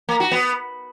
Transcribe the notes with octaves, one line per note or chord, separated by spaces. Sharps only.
A#3
F#4
B3